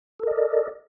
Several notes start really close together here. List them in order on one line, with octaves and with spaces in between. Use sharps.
A4 A#4 D#5 D5